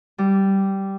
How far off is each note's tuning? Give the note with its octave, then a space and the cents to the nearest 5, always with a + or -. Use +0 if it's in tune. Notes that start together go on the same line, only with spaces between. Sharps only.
G3 -10